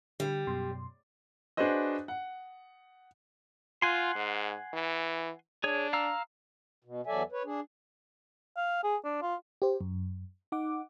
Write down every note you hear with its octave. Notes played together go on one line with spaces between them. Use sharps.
D3 G3
F#2 B2 C6
D4 F#4 G#4 B4 C5 D#5
F#5
F4 F#5 G#5 C6
G#2
E3
D4 G#4 C#5
F5 A#5 E6
B2
E2 F#3 A4 D5 E5 G#5
B4 C#5
D4 G#4
F5
G#4
D4
F4
G4 C5
F#2
D#4 F#5 D6